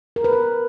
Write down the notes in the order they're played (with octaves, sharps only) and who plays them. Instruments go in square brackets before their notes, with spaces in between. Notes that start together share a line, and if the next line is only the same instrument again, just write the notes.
[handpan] A#4
B4
A#4